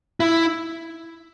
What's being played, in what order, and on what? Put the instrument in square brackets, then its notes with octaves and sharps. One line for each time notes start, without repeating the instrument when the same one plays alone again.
[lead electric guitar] E4